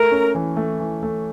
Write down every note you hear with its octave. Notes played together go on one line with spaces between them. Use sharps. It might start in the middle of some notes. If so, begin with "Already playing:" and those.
Already playing: A3 A#4
C#4
E3
A3
E3
A3